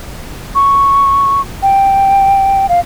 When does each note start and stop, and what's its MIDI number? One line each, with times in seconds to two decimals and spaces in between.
0.55 1.41 85
1.62 2.66 79
2.69 2.80 77